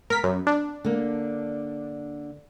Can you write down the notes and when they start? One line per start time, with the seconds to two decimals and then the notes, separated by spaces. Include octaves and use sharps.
0.10 B3 A#4 B6
0.24 F#2
0.47 D4
0.85 D3 A#3